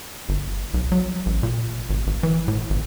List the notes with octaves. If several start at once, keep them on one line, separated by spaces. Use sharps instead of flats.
G1
B1
F#3
A1
A#2
G#1
G#1
E3
A2
G#1